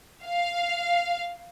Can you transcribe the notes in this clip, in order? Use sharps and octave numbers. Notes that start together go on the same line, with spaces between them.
F5